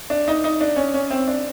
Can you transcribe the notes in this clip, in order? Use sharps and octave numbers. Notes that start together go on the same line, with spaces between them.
D4
D#4
D#4
D4
C#4
C#4
C4
D4